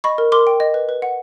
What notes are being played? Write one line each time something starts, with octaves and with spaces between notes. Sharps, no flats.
D#5 B5 C#6
A#4
A#4 C6 D6
G5
D#5
B4
B4
F#5